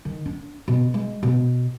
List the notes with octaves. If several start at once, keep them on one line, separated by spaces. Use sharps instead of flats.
D#3
D4
B2
G#3
B2